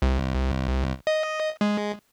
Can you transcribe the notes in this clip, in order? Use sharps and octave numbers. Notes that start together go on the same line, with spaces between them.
C2
D#5
G#3